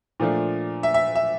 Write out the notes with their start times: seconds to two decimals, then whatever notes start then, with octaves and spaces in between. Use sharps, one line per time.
0.20 A#2 F3 A3 D4
0.83 E5
0.94 E5
1.15 E5